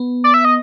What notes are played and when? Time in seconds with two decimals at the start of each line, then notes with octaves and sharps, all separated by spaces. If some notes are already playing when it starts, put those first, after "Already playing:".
Already playing: B3
0.24 D5
0.34 E5
0.45 D#5